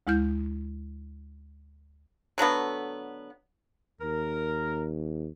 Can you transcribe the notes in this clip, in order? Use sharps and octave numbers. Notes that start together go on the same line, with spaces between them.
D2 G#3 E4 F6 G6
D3 F#3 A3 B3
D#2 A#4